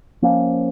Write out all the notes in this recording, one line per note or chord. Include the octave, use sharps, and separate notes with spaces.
F3 A#3 C#4